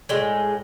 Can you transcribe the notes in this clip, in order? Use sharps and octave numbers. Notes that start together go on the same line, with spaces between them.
A2 G#3